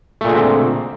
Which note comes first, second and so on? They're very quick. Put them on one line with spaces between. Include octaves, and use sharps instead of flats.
A3 A#2 G#3 D3 C4